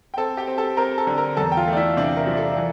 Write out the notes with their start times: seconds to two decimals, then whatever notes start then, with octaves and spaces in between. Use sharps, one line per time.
0.14 G5
0.17 C4 A4 A5
0.37 G4 G5
0.47 C4
0.58 A4 A5
0.77 C4 A#4 A#5
0.98 A4 A5
1.07 D3
1.18 A#4 A#5
1.37 E2 A4 A5
1.52 G5
1.57 F4 F5
1.68 A3 D5
1.77 E4 E5
1.97 C3 D4 D5
2.17 A#4
2.27 F3
2.37 A4
2.57 E3